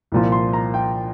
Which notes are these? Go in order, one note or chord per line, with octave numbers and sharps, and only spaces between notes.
C2 A#2 F3
C6
A#5
G5